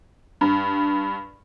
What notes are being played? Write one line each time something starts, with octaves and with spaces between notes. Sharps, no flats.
G2